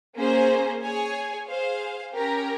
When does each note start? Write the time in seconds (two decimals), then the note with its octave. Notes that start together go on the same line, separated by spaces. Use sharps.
0.16 A#3 C#4 G#4 C5
0.82 G#4 C#5 G#5
1.48 G#4 C5 F5
2.14 C#4 G4 A#4